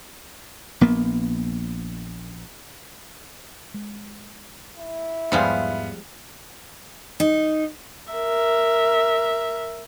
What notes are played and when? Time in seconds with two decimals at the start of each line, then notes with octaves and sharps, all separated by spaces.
0.81 A#1 A#3 B3
3.74 G#3
4.78 E4
5.32 E2 G#2 F3 G3 G#3 B3 F5
7.20 D#4
8.12 A#4 E5